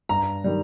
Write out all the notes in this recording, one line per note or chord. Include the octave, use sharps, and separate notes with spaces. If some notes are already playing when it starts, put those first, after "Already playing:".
G2 A#5
D#3 G3